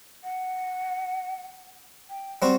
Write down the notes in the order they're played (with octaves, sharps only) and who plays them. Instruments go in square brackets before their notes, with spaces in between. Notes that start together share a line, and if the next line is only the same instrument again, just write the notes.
[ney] F#5
G5
[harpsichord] G3 C4 F#4 [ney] D5